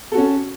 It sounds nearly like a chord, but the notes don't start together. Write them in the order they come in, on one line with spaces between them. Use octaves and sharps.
A4 F#4 C#4